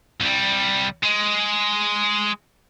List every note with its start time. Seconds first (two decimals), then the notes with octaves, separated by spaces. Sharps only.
0.21 C2 G3
1.03 G#3